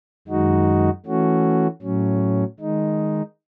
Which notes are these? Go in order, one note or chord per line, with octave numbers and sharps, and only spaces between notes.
F#2 D#3 G#3 D#4 F#4
E3 A3 C#4 F#4
A2 F#3 C#4
D#3 G#3 D#4